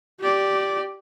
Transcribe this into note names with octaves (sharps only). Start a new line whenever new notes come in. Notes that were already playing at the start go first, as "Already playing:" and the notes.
G4 D5